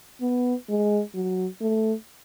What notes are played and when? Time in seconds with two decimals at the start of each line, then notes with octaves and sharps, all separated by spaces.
0.22 B3
0.69 G#3
1.14 F#3
1.61 A3